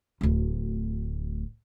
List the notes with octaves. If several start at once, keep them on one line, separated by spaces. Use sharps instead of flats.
D1 D2